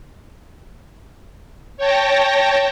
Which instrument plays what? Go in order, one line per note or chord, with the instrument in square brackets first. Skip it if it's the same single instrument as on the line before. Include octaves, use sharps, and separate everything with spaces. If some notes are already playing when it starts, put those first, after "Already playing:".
[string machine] C#5 G5 A5 A#6